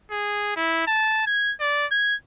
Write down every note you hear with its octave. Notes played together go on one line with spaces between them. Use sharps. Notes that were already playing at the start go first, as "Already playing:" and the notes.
G#4
E4
A5
G#6
D5
G#6